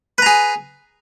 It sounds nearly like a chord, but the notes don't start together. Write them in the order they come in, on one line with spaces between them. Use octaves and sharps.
B4 A#5 G#4